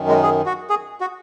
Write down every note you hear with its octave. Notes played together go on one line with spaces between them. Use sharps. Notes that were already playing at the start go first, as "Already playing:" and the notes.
Already playing: F#2 D#3
G#3
G#4
F#4
G#4
F#4